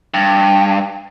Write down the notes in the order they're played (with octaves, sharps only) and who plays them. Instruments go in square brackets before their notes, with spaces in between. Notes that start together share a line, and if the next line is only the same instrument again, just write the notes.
[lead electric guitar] G2